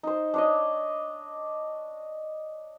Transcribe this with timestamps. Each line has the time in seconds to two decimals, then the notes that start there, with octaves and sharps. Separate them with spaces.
0.03 D#4 C5
0.34 D4 C#5 D#5